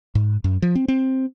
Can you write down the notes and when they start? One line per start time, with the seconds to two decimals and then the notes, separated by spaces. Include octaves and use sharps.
0.15 G#2
0.44 F#2
0.62 F3
0.75 C4
0.88 C4